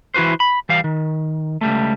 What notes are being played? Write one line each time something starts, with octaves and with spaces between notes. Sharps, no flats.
E3 E4 F#4 B4 C5
B5
E3 G3 F5
D#3
C#2 G3 A3